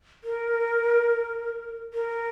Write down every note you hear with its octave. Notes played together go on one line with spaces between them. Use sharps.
A#4
A#4